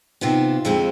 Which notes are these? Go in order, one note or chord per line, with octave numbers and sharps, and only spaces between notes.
C3 D#3 B3 F4
F2 D3 G#3 C4